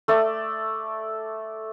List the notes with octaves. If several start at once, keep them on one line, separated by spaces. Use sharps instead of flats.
A3 A4 D5